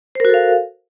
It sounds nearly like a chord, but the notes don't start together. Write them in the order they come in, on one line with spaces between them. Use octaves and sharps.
C5 A#4 F#4 A4 F5